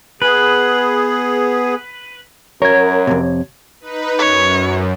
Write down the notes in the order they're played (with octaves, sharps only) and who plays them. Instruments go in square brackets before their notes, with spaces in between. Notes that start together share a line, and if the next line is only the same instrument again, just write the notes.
[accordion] B3 G#4 [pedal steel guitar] B4
[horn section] F#2 [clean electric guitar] A#4 [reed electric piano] C#5 G#6
[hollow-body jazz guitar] F2 G#2 C3
[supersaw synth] D#4 B4
[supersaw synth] F#2 [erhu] C#5